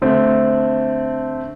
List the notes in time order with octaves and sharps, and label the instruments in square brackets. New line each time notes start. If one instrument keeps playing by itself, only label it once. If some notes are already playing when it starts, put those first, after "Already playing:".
[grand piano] D3 A3 C4